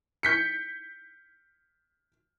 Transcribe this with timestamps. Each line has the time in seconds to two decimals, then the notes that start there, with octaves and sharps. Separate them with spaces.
0.23 G6 B6 C#7